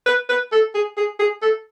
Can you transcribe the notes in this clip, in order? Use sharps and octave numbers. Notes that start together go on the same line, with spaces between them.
B4
B4
A4
G#4
G#4
G#4
A4